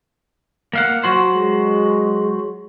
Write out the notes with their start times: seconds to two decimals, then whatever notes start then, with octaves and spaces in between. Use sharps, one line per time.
0.73 A#3 F5 F#5
1.04 F#3 F#4 C5
1.35 G#3